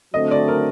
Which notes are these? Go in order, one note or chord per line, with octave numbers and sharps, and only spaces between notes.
D3 F#3 A3 C4 D#5
D5
A#4